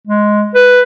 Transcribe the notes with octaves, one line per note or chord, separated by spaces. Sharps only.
G#3
B4